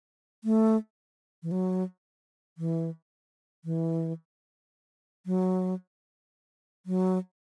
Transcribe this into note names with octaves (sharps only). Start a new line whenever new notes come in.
A3
E3
F#3
E3
E3
F#3
F#3